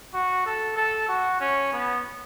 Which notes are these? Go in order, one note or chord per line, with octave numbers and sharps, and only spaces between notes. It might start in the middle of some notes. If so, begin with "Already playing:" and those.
F#4
A4
A4
F#4
C#4
B3